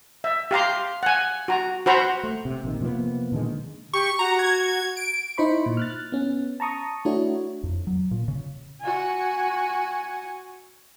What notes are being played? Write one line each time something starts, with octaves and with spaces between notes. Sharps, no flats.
E5
G4 F5 A#5 C6
F#5 G#5
F#4 A#5
F#4 C5 A#5 B5 C#6
A3
C3
A#1 D#3
C3 F3 A#3 B3
A#2 D3 D#3 G#3
G4 C#6
F#4 A#5
G#6
D7
D#4 E4 C5 B5 C#6
A#2
F6 F#6 A6
B3 C#4
A5 A#5 C#6 D#6
A3 D4 E4 F#4 C#5
F2
F#3
A#2
C#3
F#4 G#5